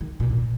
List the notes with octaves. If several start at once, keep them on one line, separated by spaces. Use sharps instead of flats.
D#3
A#2
A#2